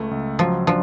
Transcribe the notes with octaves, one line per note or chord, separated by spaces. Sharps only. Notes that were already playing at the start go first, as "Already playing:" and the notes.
Already playing: C#2 A3
C#2
F3 F#3
F3 D4